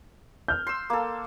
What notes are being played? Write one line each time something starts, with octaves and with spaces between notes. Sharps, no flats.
F6 G6
C6 E6
A#3 A4